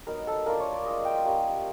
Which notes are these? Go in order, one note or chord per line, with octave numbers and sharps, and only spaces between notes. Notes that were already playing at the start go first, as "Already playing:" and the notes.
F#3 B3 D#4 A#4
A4
A#3 D4 F4 A#4
C#5
D5
G#3 C#4 F4 D#5
G5
G3 A#3 C#4